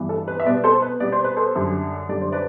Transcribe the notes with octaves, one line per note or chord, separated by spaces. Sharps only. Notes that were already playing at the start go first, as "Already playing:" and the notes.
Already playing: G2 E3 B3
A4
B4
E5
B2 G3 B3 B4 D5
A4 C5
B4
B2 G3 B3 D5
C5
B4
A4 C5
F#2 D3 G3
F#2 D3 G3 D5
C5
B4 D5